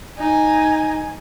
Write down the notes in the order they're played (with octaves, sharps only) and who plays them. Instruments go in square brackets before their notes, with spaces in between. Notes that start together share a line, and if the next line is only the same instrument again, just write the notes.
[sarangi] D#4 [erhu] G#5